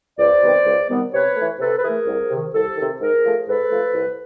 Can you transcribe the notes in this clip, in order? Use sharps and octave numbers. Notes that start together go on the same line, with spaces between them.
C#2 C5 D5
C3 D#3 G3 B3
C#2
C3 D#3 G3 B3
C3 B4 C#5
E3 A3
C3 A4 B4
B4
E3 A3 G#4 A#4
C2
C3 D#3
C2 G4 A4
C3 D#3
G#2 G#4 A#4
F3 A3
G#2 A4 B4
F3 A3
C2